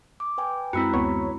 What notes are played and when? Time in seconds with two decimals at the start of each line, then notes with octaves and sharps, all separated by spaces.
0.20 D6
0.38 B4 G5 G#5
0.73 F#2 G#3 C4 E4 F#4 A#5 B5 E6
0.94 D2 B3 C#5